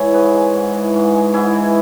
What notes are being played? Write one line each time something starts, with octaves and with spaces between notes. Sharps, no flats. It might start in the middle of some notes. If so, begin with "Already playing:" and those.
Already playing: E3 G#3 C#5 E5
G#2 G#4 B4
G#3
G#2
E3
G#2
G#3
G#2 E4 G#4
E3